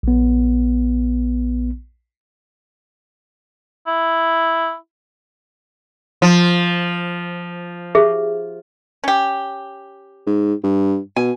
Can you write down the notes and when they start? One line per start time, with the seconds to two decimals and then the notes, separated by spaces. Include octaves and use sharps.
0.03 A#1 B3
3.87 E4
6.22 F3 C6
7.95 G4 G#4 E5
9.04 C#4 G4
10.27 G#2
10.64 G2
11.16 B2 G#5